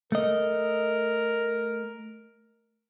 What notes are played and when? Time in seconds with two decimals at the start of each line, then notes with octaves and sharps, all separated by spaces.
0.12 A3 A#4 D#5